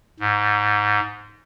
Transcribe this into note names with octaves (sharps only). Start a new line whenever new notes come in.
G#2